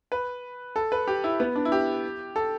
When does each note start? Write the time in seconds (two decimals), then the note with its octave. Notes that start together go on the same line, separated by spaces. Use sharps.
0.12 B4
0.76 A4
0.92 B4
1.07 G4
1.24 E4
1.40 B3
1.56 D4
1.65 E4
1.72 G4
2.36 A4